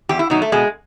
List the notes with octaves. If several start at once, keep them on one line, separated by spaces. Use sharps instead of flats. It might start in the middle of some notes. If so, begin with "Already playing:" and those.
E2 G4
E4
B2 F#3 D#4
A3
B2 G#3